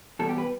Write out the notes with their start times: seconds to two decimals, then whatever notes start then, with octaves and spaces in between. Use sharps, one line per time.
0.19 E2 B2 G3 A4
0.29 G4
0.38 B4